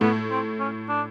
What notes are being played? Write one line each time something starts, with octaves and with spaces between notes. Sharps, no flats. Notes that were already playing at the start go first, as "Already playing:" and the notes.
A2 A3 B3
C4
C#4
D4